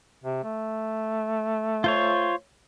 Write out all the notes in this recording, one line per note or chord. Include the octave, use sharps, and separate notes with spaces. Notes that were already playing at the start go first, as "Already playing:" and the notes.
C3
A3
F4 C5 C#5